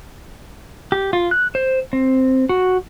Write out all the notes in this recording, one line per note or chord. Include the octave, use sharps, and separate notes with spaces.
G4
F4
F#6
C5
C4
F#4